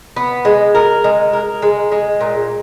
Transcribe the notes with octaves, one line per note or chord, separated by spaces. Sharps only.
B3
G#3
A#4
G#3
A#4
G#3
G#3
A#2